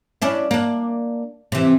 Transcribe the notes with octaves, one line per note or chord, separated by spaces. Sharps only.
C#4 D4 E4
A#3 D4
C3 E3